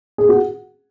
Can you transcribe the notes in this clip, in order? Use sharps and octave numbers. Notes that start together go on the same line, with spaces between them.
G#4
F#4